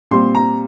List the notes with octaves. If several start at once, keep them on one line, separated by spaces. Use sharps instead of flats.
A#2 G3 C4 C6
A#5